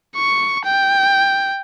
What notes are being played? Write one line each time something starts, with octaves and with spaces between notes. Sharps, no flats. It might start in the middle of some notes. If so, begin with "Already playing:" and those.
C#6
G5